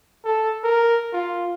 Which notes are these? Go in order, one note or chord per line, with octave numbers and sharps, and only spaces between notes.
A4
A#4
F4